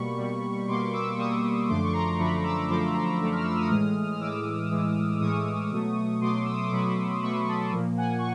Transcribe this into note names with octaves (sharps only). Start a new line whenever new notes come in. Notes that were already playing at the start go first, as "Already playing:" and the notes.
Already playing: B2 G3 A#3 B5 C#6
B2 G3 A#3
B2 G3 A#3 C6 D6
D6 E6
B2 G3 A#3 C#6 D#6
F#2 D3 F3 A3 C6 D6
C#6
A#5 C6
F#2 D3 F3 A3 B5 C#6
D6 E6
F#2 D3 F3 A3 C6 D6
A#5 C6
F#2 D3 F3 A3
F6
E6
D#6 F6
A2 E3 G#3
F6
A2 E3 G#3 D6 E6
A2 E3 G#3
A2 E3 G#3 C#6 D#6
B2 F#3 A3
B2 F#3 A3 C6 D6
E6
D#6
D6
B2 F#3 A3 B5 C#6
B2 F#3 A3 B5 C#6
A5 B5
A#2 F3 A#3
F#5 G#5
C#6